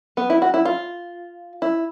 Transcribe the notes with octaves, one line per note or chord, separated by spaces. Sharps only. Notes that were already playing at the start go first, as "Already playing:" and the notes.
B3
E4
F#4
E4
F4
E4